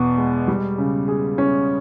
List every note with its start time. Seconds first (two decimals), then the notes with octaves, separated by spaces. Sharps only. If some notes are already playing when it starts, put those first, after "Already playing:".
Already playing: E2 B2 B3
0.18 G#3
0.48 G3
0.78 C#3
1.08 G#4
1.38 C#4